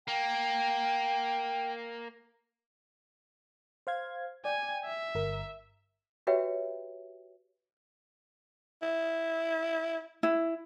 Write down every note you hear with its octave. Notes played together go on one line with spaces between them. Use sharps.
A#3 G5
C5 F5 G#6
D5 G5 G#5
E5
G1 A#4
F#4 G4 B4 C#5 E5 G5
E4
E4